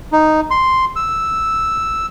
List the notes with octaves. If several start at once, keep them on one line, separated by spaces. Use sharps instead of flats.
D#4
C6
E6